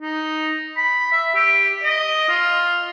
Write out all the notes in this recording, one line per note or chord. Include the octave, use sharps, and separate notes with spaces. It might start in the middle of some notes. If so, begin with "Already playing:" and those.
D#4
B5
E5
G4
D#5
F4